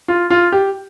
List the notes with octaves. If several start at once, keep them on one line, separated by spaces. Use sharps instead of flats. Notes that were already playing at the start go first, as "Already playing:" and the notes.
F4
F4
G4